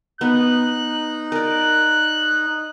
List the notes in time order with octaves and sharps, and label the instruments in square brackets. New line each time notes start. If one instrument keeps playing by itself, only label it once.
[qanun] B3 [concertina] D#4 [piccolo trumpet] F#6
[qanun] A#4 D5 [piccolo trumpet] F#6